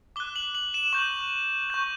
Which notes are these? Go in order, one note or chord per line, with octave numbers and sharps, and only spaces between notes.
D6 F#6 G7
F#7
F#7
E7
C#6 G6 F#7
C#6 G6